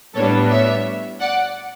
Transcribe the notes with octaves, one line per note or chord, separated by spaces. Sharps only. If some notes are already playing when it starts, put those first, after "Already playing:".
A2 G3 B3 D4 A4 C#5
C#5 E5
D5 F#5